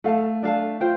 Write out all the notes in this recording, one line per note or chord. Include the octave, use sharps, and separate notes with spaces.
A3 A4 F5 A5
D4 A4 F5 A5
F4 C5 G5